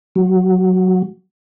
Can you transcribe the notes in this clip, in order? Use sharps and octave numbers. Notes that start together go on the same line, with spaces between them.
F#3